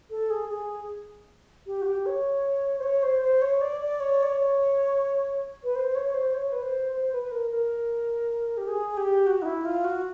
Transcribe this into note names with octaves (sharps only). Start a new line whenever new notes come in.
A4
G#4
G#4
G4
F#4
G4
C#5
C5
C#5
C5
C5
C#5
D5
D5
C#5
D5
C#5
B4
C5
C5
C#5
C#5
C5
C#5
B4
C5
C5
B4
B4
A#4
A#4
G4
G#4
G4
F#4
D#4
E4
F4
F#4